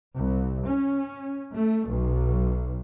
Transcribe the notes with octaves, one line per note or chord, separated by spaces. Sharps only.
C2
C#4
A3
B1